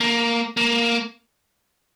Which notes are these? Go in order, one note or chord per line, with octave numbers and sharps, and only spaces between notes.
A#3
A#3